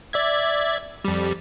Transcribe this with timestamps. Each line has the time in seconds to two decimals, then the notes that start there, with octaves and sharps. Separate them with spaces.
0.13 D5 E5 G#6
1.05 F2 G3